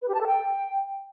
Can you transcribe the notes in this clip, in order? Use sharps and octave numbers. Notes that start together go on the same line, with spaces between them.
B4
G4
A5
A4
G5